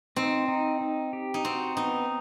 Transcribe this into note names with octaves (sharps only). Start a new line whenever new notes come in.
C4 D#4
D#4
D#4
G4
D#4
C4 F#4
B3 D#4